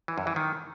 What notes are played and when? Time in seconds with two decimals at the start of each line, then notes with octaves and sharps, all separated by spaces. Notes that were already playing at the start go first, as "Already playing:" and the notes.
0.08 E3
0.18 F#2
0.27 E3
0.36 D#3